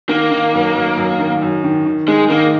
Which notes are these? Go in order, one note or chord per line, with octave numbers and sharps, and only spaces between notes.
D#3 A#3
D#3
F#2
F#2
F#2
D#3
F#2
D#3
D#3
G#3 D#4
D#3 A#3